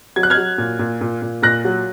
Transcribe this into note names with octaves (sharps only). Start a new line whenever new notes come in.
F#3 G#6
F#6
F6 G#6
F#3
A#2
A#2
A#2
A#2
A#2 F#6 A#6
F#3